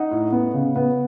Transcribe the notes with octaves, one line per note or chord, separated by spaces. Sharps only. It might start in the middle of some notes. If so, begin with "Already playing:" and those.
Already playing: D#4 F#5
A2
B3
C#3
B3